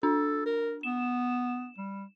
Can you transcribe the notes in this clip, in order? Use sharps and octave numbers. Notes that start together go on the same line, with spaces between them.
D4 A4
A#4
B3 E7
G3